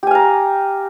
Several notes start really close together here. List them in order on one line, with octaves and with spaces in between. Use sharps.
G4 G#5 F5 A#5